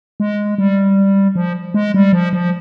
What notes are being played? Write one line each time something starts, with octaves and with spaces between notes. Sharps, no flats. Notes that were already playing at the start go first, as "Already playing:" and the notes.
G#3
G3
F3
G#3
G3
F3
F3